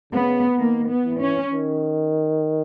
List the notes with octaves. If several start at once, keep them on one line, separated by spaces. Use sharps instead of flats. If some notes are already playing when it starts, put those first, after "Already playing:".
C#3 B3
D#3 A#3
B3
E3
C#4
D#3